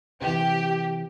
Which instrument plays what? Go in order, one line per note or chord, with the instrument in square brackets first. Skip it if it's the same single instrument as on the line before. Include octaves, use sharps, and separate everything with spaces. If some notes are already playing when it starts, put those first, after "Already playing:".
[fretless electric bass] C3 E3 [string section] G4